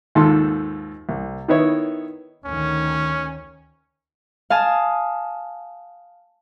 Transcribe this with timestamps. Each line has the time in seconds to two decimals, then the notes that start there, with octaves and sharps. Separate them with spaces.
0.15 D#2 G#2 F4 A4 A5 C6
1.09 C2
1.48 D#3 B3 D#4 E4 C#5
2.45 D2 D#3 C#4
4.50 F5 G#5 A5 D#6